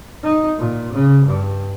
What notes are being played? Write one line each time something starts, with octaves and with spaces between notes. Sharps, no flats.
D#4
A#2
C#3
G2